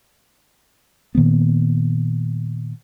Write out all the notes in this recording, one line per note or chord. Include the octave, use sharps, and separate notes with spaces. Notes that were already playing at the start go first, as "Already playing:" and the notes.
A#2 D#3 A#3 B3